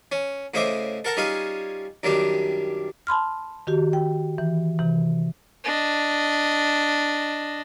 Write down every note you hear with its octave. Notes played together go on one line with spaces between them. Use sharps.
C#4
A2 C#3 C5 D#5 E5 D6
A4 A#4 F#5 A5 A#5
G3 C#4 D#4 F4 G#4 F5
F#2 D#3 G3 D4 G4
A5 B5 C6 F6
D#3 F#4 G4
G5
E3
C3 E3
D4 D#5